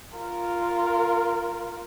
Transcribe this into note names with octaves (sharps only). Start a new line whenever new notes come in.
F4 A#4